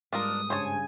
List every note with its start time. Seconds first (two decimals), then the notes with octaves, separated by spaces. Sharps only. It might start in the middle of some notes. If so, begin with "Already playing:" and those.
0.13 G#2 G3 G#3 D4 F4 A#4 D#6
0.50 G2 C#3 C5 C#5 G#5 A5